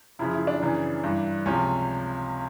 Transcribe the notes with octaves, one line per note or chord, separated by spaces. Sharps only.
F#2 C#3 F3 E4
E4
D4
F#2 C#3 E3
G2 E3
C#2 C3 F3 C#4